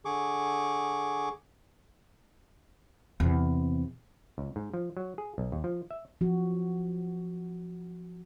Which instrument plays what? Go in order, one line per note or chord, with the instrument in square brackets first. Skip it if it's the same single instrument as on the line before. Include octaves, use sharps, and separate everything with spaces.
[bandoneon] D3 G#4 C#6 D6
[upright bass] E2 C3
[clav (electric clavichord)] C#2
G#2
F3
F#3
G#4
B1
D#2
F3
E5
[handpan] F3 F#4